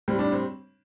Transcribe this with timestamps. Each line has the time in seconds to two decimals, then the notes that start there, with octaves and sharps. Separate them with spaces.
0.08 A2 G3 C4
0.19 D4
0.32 C4